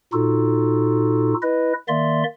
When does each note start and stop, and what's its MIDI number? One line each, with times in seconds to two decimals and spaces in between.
0.13 1.34 46
0.13 1.34 63
0.13 1.34 65
0.13 1.34 66
0.13 1.34 69
1.42 1.73 64
1.42 1.73 71
1.42 1.73 75
1.88 2.24 51
1.88 2.24 58
1.88 2.24 74
1.88 2.24 76
1.88 2.24 84